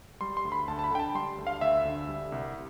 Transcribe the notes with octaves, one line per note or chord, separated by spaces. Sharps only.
G3 C6
C6
D2
B5
D2 A5
A5
B5
D3 G5
A5
G3 C6
D2
F5
D2 E5
D3
G3
C2